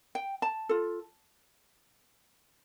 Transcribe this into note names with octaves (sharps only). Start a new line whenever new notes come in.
G5
A5
F4 A4